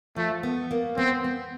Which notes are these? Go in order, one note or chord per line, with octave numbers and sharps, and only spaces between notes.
F3 A3
B3
A#3
B3 C4
B3